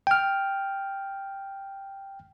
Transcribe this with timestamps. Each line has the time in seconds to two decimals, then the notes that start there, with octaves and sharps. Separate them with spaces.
0.07 G5 F6